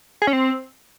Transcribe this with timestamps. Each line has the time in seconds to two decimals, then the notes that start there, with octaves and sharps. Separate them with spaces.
0.22 G#4
0.27 C#4
0.33 C4